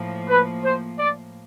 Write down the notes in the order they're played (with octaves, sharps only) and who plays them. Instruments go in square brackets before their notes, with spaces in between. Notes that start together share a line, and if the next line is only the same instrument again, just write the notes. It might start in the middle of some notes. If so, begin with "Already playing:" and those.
Already playing: [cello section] A2 F3 A#3
[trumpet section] B4
C5
D5